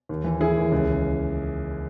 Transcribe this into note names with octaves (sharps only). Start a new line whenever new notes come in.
D#2
E3
E3 E4 G#4
D#2
C#2